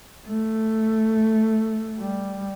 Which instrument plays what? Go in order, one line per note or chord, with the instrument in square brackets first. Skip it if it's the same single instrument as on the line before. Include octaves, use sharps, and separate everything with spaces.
[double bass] A3
G3